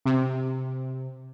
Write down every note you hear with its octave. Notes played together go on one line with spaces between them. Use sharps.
C3